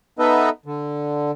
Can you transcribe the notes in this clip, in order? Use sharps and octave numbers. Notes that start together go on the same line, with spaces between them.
B3 D#4 A4 B4 D#5 E5
D3